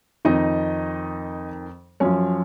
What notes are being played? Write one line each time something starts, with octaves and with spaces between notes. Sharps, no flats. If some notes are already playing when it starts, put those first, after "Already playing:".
F2 D#3 D#4 D#5
F#2 F3 C#4 C#5